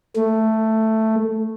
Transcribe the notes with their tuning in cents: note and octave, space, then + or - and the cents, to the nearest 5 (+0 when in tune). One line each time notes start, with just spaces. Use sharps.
A3 +5